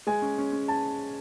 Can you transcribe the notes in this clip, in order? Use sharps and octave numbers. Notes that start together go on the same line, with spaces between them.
G#3 G#5
C#4
C#4
C#4
A5